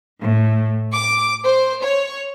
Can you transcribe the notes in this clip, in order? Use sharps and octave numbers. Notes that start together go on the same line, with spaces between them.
A2
D6
C5
C#5